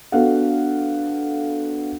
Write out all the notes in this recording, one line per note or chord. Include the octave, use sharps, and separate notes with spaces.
B3 D4 F#4 A4 F5 F#5